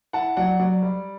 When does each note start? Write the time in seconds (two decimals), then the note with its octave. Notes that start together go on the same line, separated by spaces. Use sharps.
0.13 E4 F#5 A5
0.37 F#3 D5 F#5
0.60 F#3 D5
0.83 G3